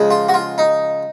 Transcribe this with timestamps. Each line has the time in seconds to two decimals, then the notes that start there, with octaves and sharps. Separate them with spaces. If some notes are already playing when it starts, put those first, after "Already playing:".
Already playing: C#3 F3 G#3
0.11 F4
0.29 F#4
0.34 F4
0.58 D#4